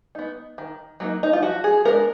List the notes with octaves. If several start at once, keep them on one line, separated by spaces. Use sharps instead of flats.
B3 D#4
D#3
F#3 A#3 D#4
D#4
F4
F3 F#4
G#4
G#3 B3 D4 A#4